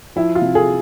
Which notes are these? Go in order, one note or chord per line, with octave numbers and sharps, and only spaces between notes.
F3 E4
F4
C3
G#4